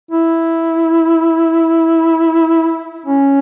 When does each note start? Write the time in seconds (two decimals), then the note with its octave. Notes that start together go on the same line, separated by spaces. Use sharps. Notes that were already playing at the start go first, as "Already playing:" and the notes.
0.11 E4
3.06 C#4